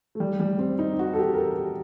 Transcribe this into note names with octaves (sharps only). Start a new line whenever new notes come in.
A3
G3
G3
C4
D#4
F#4
A4
G4
A#4
A4
G4